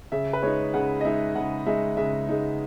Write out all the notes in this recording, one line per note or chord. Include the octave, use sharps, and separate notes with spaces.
C#3 E5
B4
G#3 D#4 C#5
C#3 F#5
D#5
G#3 D#4 E5
C#3 F#5
G#3 D#4 E5
C#3 E5
G#3 D#4